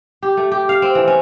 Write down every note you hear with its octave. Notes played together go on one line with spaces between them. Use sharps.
G4
A3
G4
F5
C4
E3
C#4